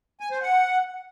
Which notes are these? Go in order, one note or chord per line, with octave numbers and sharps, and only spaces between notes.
G#5
C5
F#5